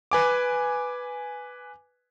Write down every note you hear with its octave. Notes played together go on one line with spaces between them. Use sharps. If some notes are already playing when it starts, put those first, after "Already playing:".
B4 G#5 D6